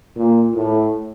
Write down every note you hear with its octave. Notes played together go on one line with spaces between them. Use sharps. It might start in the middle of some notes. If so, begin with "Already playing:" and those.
A#2
A2